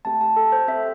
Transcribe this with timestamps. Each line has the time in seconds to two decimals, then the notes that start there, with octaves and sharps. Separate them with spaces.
0.05 A3 C4 G4 A5
0.21 A5
0.36 A4
0.52 C5
0.68 C4 G4 E5